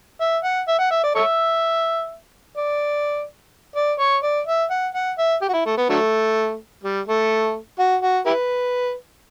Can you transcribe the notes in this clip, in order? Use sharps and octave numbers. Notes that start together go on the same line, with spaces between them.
E5
F#5
E5
F#5
E5
D5
A4 C#5 E5
D5
D5
C#5
D5
E5
F#5
F#5
E5
G4
F#4
E4
A3
B3
D3 F#3 A3
G3
A3
F#4
F#4
E4 G4 B4